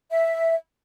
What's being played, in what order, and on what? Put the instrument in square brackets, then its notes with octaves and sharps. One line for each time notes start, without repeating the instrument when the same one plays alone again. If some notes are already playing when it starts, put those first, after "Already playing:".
[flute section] E5